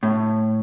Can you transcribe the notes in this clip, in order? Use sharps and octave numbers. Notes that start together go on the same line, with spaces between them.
A2